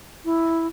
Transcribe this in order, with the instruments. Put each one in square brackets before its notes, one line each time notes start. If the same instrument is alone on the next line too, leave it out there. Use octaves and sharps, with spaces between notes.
[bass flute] E4